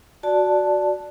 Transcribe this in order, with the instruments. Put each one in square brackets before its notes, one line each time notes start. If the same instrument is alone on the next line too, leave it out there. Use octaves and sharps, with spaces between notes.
[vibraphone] F#4 D5 A5